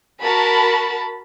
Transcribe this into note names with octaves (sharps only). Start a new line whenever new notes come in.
F#4 A#4 A5 B5